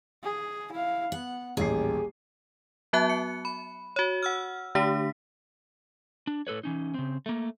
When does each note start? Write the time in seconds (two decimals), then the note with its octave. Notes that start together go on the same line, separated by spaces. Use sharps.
0.24 G#4
0.72 E4 F5
1.12 B3 F#5
1.57 D#1 A1 G4 G#4 C7
2.93 F#3 B3 F#4 E5 A5 F#6
3.09 C#7
3.45 B5
3.96 F#4 C#5
4.23 F#5 E6 F6
4.75 D3 A3 D4 G4 B6
6.27 D4
6.47 A2 A4 B4 C#5
6.64 E3 C#4 D#4
6.94 C#3 C4
7.26 A3 A#3